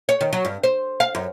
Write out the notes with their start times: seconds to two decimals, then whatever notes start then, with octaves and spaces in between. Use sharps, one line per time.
0.09 C#5
0.21 D#3
0.33 F#3
0.45 G2
0.63 C5
1.00 F5
1.15 F#2